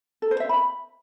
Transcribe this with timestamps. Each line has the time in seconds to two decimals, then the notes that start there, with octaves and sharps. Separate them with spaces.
0.22 A4
0.31 C5
0.40 E5
0.49 B5